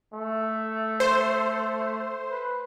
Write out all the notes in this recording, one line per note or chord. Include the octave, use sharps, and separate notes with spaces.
A3
C5
B4